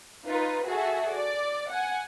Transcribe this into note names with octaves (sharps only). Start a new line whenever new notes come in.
D#4 F4 B4
F#4 G#4 A4 E5 F#5
D5
F#5 G#5